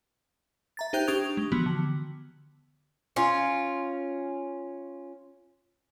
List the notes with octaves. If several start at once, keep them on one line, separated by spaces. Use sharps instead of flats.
E5 A#5 A6
D#4 G4 C5 G5 F#6 G6
D4 G4 C#6 D#6 G#6 F7
G#3
E3 F3 B3 F#4
D3
C#4 F4